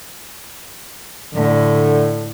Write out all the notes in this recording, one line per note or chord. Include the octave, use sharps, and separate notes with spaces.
A2 D3